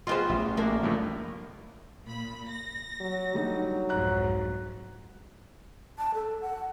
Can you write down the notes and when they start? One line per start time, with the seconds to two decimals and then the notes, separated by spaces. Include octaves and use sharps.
0.07 F#3 B3 F4 G4 G#4 C5 D#5 C6
0.29 A1 E5
0.57 A3 A#3 D4
0.83 C#2 G2 F3
2.04 A#2 B5
2.49 A#6
3.00 F#3
3.34 D3 F#3 G3 D#4
3.89 C2 F2 G#2 A#5 F#6
5.98 A5
6.14 A4
6.41 F#5